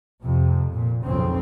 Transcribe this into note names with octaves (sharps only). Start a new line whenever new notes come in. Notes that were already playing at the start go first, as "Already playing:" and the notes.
F2 C3
A#2
B1 F2 C#3 C4